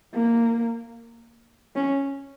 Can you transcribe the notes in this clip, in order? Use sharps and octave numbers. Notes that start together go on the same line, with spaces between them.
A#3
C#4